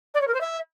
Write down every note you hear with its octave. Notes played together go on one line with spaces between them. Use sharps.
D5
C#5
A#4
C5
E5